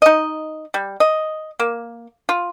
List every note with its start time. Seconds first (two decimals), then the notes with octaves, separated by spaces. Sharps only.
0.02 D#4 D#5
0.74 G3
1.00 D#5
1.59 A#3
2.29 F4